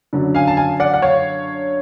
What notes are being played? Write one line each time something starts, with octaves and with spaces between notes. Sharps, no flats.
F#2 D3 F#3
F5 G#5
A5
F5 G#5
D5 F#5
F#5
C#5 F5